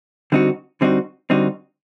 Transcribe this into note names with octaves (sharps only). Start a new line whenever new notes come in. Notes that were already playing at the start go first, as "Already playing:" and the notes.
D3 G3 C4 D#4 F#4
D3 G3 C4 D#4 F#4
D3 G3 C4 D#4 F#4